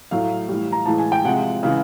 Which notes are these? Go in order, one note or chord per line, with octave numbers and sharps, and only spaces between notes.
A2 F#3 A3 F5
A2 E3 G3
A#5
A2 E3 G#3 A5
G#5
G5
C3 F3 G#3 F#5
C#3 E3 G#3